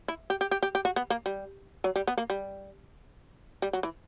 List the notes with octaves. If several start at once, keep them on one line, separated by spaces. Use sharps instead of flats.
E4
G4
G4
G4
G4
G4
F#4
B3
A#3
G3
F#3
G3
B3
A#3
G3
G3
F#3
E3